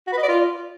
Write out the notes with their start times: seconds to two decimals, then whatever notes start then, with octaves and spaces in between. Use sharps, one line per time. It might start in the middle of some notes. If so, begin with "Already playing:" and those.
0.07 F#4
0.12 B4
0.18 D#5
0.23 D5
0.28 F4